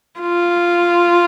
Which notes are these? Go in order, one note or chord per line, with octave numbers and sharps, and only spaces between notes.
F4